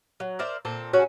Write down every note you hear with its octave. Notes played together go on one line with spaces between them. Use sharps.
F#3
A#4 C5 D5 E5
A#2 C4 A4
C#3 F#3 C#4 F#4